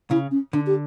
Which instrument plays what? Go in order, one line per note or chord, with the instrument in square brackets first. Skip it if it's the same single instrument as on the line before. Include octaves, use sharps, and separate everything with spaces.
[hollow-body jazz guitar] C#3 [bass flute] E4
[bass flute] C#4
[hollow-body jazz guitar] D3 [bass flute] D4
[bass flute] G4